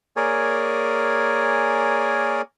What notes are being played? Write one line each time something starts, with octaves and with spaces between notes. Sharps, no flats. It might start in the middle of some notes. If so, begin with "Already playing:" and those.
A#3 G#4 A#4 C#5 D5 G#5